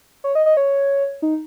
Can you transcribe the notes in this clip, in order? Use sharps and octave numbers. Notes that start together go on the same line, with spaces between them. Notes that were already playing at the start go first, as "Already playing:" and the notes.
C#5
D#5
D#5
C#5
D#4